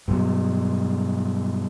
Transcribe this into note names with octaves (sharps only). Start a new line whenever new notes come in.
G2 B2 F#3